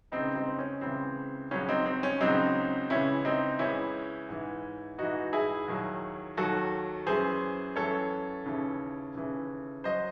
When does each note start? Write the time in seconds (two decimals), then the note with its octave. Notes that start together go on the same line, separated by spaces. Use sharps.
0.12 C#2 C#3 E3 C4 D#4
0.35 C4 D#4
0.59 C#4
0.81 C#2 C#3 E3 C4
1.51 C#2 C#3 F#3 C#4
1.69 C4 D#4
1.86 C4
2.03 C#4
2.21 C#2 C#3 F#3 C4 D#4
2.90 C#2 C#3 E3 C#4 E4
3.25 C4 D#4
3.59 C#2 C#3 E3 C#4 E4
4.29 G#2 E3
4.98 G#2 E3 D#4 F#4
5.33 E4 G#4
5.68 D#2 D#3 F#3
6.37 D#2 D#3 F#3 F#4 A4
7.07 F#2 E3 G#4 C5
7.76 F#2 E3 A4 C#5
8.46 D#2 C#3 E3
9.15 D#2 C#3 E3
9.84 F#3 C5 D#5